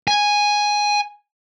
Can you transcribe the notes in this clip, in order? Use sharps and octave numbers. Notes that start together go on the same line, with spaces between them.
G#5